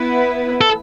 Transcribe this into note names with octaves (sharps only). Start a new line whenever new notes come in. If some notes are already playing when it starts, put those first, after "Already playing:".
Already playing: B3 E4 B4
A4